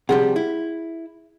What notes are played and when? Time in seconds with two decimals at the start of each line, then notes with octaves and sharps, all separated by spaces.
0.09 C3 F3 G3 G#4 F#5
0.36 E4